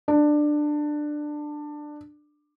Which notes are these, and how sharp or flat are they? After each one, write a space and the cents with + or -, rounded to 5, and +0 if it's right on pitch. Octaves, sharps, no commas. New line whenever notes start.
D4 +15